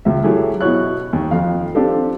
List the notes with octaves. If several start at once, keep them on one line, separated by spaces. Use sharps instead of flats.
C#2 E5
F#3 A3 E4 G4 G#4
B2 E4 F#4 C#5 F#6
D#2
F2 F5
C4 D4 F4 G4 A4